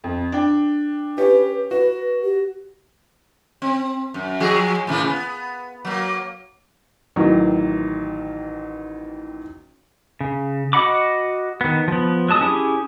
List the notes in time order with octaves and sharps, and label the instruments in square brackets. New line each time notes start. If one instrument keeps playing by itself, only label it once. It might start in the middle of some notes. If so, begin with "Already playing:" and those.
[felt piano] F2
D4 G5
[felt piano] C#4 G4 [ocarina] B4
[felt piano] F#4 [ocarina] B4
[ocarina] G4
[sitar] C4
F#2
F3 F#4 G#4
A2 C#3 E3
B3
F#3 A#3
[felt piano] A1 D#3 E3 F#3
[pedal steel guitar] C#3
F#4 D#5 F#5 B5 D6
D#3 B3
F3 B3
F#3 G#3 A5 D#6
C#4 E4 G4 G#4